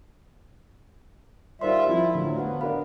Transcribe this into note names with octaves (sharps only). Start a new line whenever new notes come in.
G3 D#4 F4 A#4 C5 D5 E5 C6
F3 C4 E4
A2 D3 F#3
B3 F#4 B4 F5 F#5
D4 A#4 F5 B5